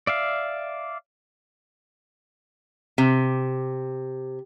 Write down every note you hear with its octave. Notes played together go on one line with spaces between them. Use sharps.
D5 E5 F5
C3